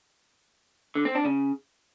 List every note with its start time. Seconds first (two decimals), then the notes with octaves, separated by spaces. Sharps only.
0.95 D3
1.05 C4
1.15 D4
1.25 C#3